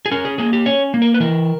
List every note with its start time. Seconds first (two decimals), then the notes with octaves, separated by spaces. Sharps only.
0.06 G#4
0.11 C#4 A#4
0.25 G#4
0.38 A#3 G#4
0.53 G4
0.66 C#4 C#5
0.94 A#3
1.02 A#4
1.14 B4
1.20 E3 A#4